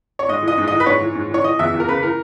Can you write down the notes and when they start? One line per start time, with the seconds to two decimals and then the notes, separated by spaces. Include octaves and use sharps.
0.19 C#5
0.28 G#2 D#5
0.43 E3 D#5
0.58 G#2
0.68 E3 D#5
0.80 B4
0.86 G#2 C#5
1.01 E3
1.15 G#2
1.31 E3 C#5
1.44 E3 D#5
1.59 E2 E5
1.74 E2
1.80 A#4
1.88 C#3 B4
2.03 E3 A#4